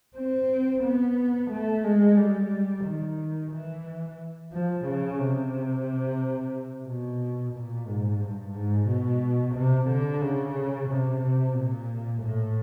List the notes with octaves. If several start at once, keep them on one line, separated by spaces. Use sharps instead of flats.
C4
B3
A3
G#3
G3
D#3
E3
F3
C#3
C3
B2
A#2
G#2
G2
G#2
B2
C3
D3
C#3
C3
C3
A#2
A2